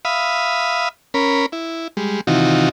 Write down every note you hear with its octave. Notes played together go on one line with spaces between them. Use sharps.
E5 F5 B5 D#6
C#4 A#4 B5
E4
G3 G#3
C3 D#3 E3 D#4 F4 F#4